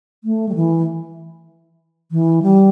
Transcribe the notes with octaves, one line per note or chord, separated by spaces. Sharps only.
A3
G3
E3
E3
G3